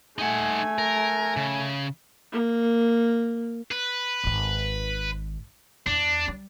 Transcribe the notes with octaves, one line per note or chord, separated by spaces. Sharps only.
A3 D#4 F#5 G#5
A#4
C#3
A#3
B4
G#1 D#3
E2 D4
G3